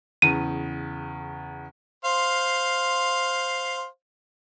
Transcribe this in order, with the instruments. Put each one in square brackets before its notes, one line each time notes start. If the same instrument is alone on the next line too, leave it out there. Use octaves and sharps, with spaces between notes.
[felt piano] E2 C#3 [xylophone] D#7
[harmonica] C5 F5